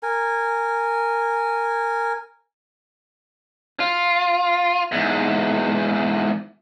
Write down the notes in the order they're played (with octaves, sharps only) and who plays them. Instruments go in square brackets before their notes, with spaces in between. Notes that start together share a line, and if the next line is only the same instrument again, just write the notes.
[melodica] A#4 G#5
[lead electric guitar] F4
E2 G#2